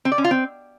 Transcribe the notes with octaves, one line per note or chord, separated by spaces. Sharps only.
C4
D5
C#4
F4
C4